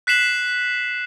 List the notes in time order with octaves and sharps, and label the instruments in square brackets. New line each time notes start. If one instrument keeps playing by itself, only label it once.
[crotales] F#6 B6 C7 E7 F#7